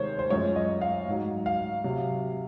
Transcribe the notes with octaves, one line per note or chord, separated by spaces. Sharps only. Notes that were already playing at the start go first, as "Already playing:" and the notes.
Already playing: C3 D#3 G#3 C5 C#5
C5
F#2 F3 G#3 C#5
D#5
F5
G#2 F#3
F5
C3 F#3